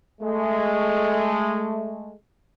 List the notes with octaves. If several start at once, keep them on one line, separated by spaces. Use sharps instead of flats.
G#3 A3